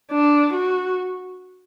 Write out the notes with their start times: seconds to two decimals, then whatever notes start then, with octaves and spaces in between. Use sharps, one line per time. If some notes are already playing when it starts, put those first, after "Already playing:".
0.11 D4
0.53 F#4